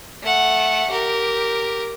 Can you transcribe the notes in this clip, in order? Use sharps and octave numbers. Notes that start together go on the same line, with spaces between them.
A3 F#5
G4 A#4